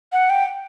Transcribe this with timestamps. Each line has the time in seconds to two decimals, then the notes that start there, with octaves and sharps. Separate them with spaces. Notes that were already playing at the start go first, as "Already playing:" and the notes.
0.12 F#5
0.30 G5